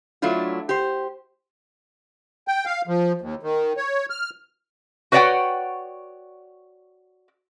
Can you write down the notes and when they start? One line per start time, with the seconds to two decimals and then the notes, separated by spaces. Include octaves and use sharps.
0.22 F#3 A3 D4 E4 F4
0.69 G4 C5
2.48 G5
2.66 F5
2.87 F3
3.21 D#2
3.43 D#3
3.77 C#5
4.10 F6
5.12 F#4 B4 C#5 D5 F#5 G5